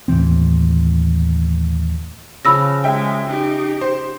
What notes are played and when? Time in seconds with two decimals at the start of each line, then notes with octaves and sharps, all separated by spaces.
0.08 D#2 A2 E3 C4
2.45 C#3 F3 C#4 B5 E6 A#6
2.84 G#3 E5 G5
3.27 D#4 G4
3.81 C5